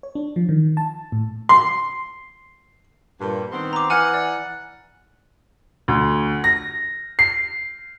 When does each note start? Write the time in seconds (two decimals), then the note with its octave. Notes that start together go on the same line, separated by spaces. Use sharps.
0.03 C#5
0.15 D4
0.36 F3
0.49 D#3
0.77 A5
1.12 A2
1.49 C6
3.21 G2 A#2
3.52 D#3 B3 C4
3.73 A#5 D6
3.90 E3 F#5 G#5 F6
4.14 D5
5.88 D2
6.44 A#6
7.19 C7